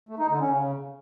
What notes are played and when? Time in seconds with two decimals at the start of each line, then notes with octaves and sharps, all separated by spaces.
0.09 A3
0.19 D#4
0.29 D3
0.40 C#4
0.50 C#3